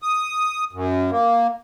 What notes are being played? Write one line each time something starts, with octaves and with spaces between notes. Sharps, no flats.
D#6
F#2
A#3